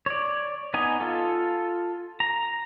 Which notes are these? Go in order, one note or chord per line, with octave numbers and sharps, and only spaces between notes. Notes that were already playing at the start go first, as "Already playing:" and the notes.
C#5 D5
B3 D#4 D#5 G#5
F4 A4
A#5